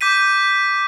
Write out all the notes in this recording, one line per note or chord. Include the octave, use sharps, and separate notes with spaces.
D6 G6 B6 D#7